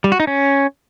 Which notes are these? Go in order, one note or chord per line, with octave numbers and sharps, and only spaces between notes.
G3
F#4
D#4
C#4